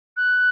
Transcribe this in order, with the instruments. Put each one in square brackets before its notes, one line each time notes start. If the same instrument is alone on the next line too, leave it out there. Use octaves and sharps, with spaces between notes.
[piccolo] F#6